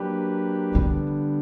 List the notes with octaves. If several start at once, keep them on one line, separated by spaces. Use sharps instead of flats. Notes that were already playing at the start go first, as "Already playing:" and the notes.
Already playing: F#3 A#3 D4 G4 B4
D3 E3 G3 B3 D4